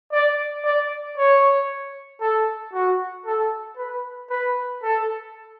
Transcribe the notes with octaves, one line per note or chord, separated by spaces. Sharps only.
D5
D5
C#5
A4
F#4
A4
B4
B4
A4